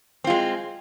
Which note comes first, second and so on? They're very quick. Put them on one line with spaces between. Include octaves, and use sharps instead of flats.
C4 F4 G#3